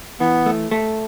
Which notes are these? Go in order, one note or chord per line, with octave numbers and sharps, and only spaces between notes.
E3 B3
A3
A3